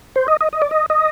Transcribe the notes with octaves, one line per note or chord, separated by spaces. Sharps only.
C5
D#5
D#5
D#5
D5
D#5
D#5